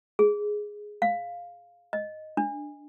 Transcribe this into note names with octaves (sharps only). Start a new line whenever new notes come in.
G#4
F5
D#5
D4